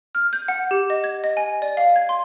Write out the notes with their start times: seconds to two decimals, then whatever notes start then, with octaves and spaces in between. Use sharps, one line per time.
0.15 F6
0.33 G6
0.48 F#5
0.71 G4
0.90 D#5
1.04 G#6
1.24 D#5
1.37 G#5
1.62 D5
1.77 F5
1.96 G#6
2.09 C6